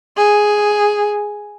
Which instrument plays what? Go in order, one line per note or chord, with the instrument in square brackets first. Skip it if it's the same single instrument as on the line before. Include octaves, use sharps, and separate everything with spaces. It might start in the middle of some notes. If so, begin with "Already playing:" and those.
[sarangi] G#4